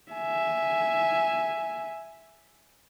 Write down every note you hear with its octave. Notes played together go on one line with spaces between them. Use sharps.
E5 G#5